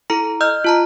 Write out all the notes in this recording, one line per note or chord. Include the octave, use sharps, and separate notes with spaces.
E4 A4 A#5
D#5 E6 F6 G6
F4 A5 A#5